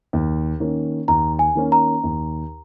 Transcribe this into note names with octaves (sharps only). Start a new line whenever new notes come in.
D#2
D#3 A#3 C#4
D#2 A#5
G#5
D#3 A#3 C#4
A#5
D#2